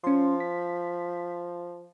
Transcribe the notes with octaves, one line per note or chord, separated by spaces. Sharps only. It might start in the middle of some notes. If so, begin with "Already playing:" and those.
F3 C#4 C6
B6